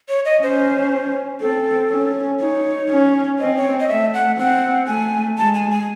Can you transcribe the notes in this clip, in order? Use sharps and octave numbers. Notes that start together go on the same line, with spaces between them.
C#5
D#5
C#4 C5
C4 A4
C#4
D#4 C#5
C#4
C4 D#5
C#5
D#5
A3 E5
F#5
C4 F#5
A3 G#5
G#3 A5
G#5
G#5